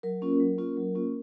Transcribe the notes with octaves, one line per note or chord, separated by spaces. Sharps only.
F#3 A#4
A#3 C#4 F4
F#3
A#3 C#4 F4
F#3
A#3 C#4 F4